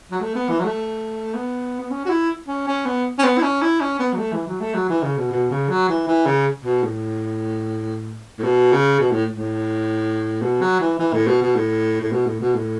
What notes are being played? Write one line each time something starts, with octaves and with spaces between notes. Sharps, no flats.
F#3
A3
B3
E3
F#3
A3
B3
B3
C#4
F#4
E4
C#4
C#4
B3
C#4
B3
E4
C#4
E4
C#4
B3
F#3
A3
E3
F#3
A3
F#3
E3
C#3
B2
B2
C#3
F#3
E3
E3
C#3
B2
A2
A2
B2
C#3
B2
A2
A2
B2
F#3
E3
E3
A2
B2
B2
A2
A2
B2
A2
B2
A2